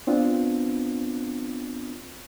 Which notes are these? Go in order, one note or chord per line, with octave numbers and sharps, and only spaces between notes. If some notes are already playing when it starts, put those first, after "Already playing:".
B3 C4 D4 F4